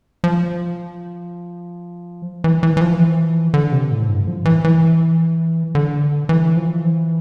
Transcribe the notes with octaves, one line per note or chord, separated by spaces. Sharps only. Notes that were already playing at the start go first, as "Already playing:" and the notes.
F3
E3
E3
E3
F3
E3
D3
C3
A2
G2
F3
E3
E3
D3
E3
F3
E3